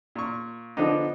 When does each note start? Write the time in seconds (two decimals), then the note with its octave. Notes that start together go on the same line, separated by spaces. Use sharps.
0.16 A#2 C#6
0.77 D3 F3 B3 D4 D#4